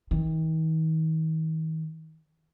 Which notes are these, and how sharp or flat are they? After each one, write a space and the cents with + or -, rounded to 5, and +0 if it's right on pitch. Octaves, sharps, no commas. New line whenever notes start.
D#3 +40